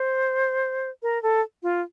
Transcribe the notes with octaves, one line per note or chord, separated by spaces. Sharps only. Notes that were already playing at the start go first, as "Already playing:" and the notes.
Already playing: C5
A#4
A4
F4